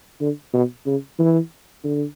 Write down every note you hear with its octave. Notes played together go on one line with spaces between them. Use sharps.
D3
B2
C#3
E3
D3